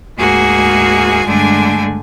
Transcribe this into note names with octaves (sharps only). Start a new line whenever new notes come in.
D2 G#2 A#3 F#4 G#4 G#5
G2 D3 G#3 A3 D4 G#5